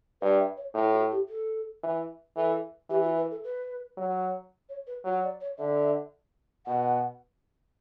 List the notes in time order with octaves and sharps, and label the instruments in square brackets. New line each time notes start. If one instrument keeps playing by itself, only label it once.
[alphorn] G2 [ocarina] B4
[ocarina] E5
C#5
[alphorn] A2 [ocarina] E4
[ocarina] F#4
G4
A4
[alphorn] E3
[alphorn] E3 [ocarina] A4
[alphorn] E3 [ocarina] G4
[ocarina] F#4
B4
A4
B4
[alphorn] F#3
[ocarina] C#5
B4
[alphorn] F#3 [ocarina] F#4
[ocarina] D5
C#5
[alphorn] D3 [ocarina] E5
[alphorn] B2 [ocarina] F#5